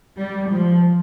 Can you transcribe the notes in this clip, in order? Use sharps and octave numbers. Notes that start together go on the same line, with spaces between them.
G3
F3